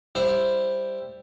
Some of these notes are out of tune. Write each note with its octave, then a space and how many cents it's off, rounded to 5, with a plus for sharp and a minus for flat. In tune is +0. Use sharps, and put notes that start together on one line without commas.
G3 +5 E4 +0 C5 +0